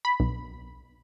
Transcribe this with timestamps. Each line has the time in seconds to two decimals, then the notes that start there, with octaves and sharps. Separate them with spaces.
0.05 B5
0.20 B1